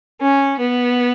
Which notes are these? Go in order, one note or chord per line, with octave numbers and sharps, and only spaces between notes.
C#4
B3